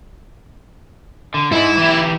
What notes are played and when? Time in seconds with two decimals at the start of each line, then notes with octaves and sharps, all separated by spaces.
1.34 D3
1.52 G#2 E4
1.77 E3 G4